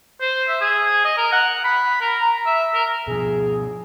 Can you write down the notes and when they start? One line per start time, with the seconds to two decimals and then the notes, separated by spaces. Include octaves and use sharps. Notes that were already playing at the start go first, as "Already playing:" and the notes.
0.21 C5
0.48 E5
0.61 G#4
1.05 D#5
1.17 A#4
1.32 F#5
1.64 B5
2.01 A#4
2.22 A#5
2.46 E5
2.74 A#4
3.07 B2 F3 G#4